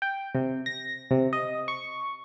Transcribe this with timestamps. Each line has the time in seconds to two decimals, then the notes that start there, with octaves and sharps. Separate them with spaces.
0.02 G5
0.35 C3
0.66 A#6
1.11 C3
1.33 D#5
1.68 C#6